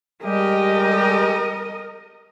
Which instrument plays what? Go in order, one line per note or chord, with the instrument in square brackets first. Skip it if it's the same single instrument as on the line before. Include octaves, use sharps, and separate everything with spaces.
[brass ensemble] G3 G#3 G4 [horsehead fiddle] A#4 D#5